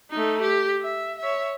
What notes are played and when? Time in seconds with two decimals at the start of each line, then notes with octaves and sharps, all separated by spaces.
0.11 A3 D#4
0.42 G4
0.82 E5
1.19 C#5 E5